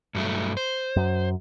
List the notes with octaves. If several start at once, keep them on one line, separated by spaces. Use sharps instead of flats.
G2 F#3 A3
C5
F#2